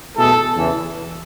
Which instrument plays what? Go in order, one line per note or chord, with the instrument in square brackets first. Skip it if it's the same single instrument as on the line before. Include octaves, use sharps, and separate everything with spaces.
[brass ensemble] E2 B2 A3 E4 G#4 [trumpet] A4
[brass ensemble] E2 C#3 E3